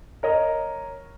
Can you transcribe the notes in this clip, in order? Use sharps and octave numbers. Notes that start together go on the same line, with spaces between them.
A#4 C#5 D#5